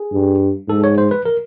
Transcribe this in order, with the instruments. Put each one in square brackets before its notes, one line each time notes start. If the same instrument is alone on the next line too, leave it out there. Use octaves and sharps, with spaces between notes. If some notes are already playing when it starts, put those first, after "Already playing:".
Already playing: [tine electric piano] G#4
[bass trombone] G2
[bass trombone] G#2 [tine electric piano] A4
[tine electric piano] C#5
C5
B4
A#4